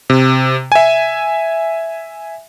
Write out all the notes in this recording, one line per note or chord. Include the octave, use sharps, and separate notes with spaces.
C3
E5 G#5